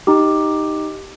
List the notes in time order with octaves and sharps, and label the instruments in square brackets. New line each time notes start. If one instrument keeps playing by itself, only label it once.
[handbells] D#4 G4